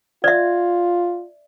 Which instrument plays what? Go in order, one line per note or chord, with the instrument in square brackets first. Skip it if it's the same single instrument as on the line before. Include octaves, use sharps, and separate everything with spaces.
[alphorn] F4 [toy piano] D5 E5